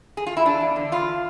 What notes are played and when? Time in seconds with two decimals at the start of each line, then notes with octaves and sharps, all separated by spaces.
0.17 G#4
0.27 F4
0.37 E4
0.45 E2 D4
0.61 E2
0.76 D3
0.92 E2 F4